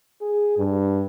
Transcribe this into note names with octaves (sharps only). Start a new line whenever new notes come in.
G#4
G2